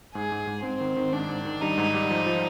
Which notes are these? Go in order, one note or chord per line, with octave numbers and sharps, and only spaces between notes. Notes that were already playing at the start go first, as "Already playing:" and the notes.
G#2 G#4
G#2
G#2
G#2 C4
D#3
D#3
G#2 D4
G#2
D#3
G3 D#4
G#2
G3
F3
F3